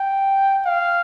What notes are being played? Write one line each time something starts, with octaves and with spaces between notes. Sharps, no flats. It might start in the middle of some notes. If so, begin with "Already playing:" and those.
Already playing: G5
F5